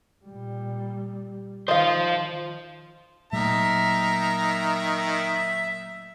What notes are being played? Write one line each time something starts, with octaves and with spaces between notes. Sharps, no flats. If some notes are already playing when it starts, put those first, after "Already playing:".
A#2 G3
D#3 F4 C5 D#5 F5
A#2 D#3 F#3 A3 E5 A#5